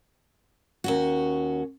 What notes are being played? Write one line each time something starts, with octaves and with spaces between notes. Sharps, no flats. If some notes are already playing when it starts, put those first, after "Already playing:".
D#2 C#4 F#4